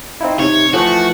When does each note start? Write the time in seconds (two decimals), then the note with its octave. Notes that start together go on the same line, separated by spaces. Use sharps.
0.21 C4 D#4 E4 F5
0.40 C3 D#4 C#5
0.73 E3 F3 A3 F#4 A5